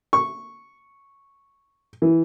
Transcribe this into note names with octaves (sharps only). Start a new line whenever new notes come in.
C#6
E3